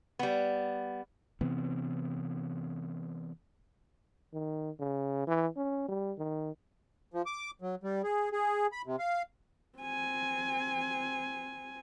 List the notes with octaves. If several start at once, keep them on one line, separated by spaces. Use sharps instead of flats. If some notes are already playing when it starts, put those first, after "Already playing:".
G3 B3
C3 E3 B3 C4
D#3
C#3
E3
C#4
G3
D#3
F3
D6
F#3
G3
G#4
G#4
B5
C3
F5
C4 G#5